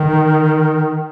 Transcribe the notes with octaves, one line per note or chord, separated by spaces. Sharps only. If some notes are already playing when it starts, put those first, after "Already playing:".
Already playing: D#3